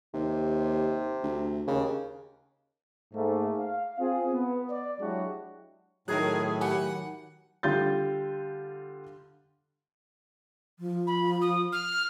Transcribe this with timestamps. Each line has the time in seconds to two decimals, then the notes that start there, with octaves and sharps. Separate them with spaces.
0.14 D#2 C3
1.23 D2
1.67 D#2 C#3
3.14 G#2 A3 A#3
3.58 F5
4.00 C4 F4 G#4
4.32 B3
4.70 D5
5.01 F#3 G#3 D4 E4 F#4 G4
6.08 A2 D#3 F#3 G#4 A#4 A#5 F#6
6.61 G4 F#5 G#5 B5
7.63 D3 G3 F4 G6 A6
10.79 F3
11.07 B5
11.42 D#6
11.72 F6